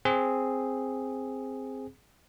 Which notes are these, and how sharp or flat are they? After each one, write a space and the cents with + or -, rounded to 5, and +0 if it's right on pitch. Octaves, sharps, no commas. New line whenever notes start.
C4 +0 G#4 +0